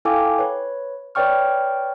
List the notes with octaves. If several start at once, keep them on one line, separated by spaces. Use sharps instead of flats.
E4 A4 F5 G5 G#5 D6
B4 C#5
B4 C#5 D5 G5 C#6 F6